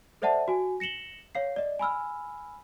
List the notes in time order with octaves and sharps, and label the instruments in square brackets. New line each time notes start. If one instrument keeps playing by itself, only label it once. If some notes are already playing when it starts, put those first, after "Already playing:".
[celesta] A4 C5 D5 E5 F#5 A5
F#4 G#5
A#6 C#7 E7 F#7 G7
C#5 F5 C7
D5 D#5
G#5 B5 E6 F6